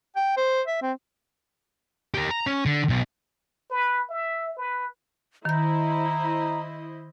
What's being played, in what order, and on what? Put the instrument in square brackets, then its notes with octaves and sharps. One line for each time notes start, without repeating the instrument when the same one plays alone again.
[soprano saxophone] G5
C5
E5
C4
[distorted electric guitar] G4 A#4
A#5
C#4
D3
B1
[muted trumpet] B4
E5
B4
[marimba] D#3 G6 [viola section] E4 C5 D#5 [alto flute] A#5